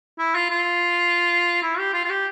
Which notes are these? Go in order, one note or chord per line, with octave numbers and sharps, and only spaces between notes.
E4
F4
F4
E4
G4
F4
F4
G4